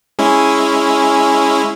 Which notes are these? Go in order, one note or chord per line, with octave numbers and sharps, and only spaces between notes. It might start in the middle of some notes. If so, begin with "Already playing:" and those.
G#3 C#4 E4